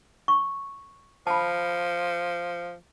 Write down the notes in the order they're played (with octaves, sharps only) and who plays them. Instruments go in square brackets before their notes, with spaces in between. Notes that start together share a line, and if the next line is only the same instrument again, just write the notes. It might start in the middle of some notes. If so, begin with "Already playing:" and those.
[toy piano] C#6
[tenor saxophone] F3 [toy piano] A5 B5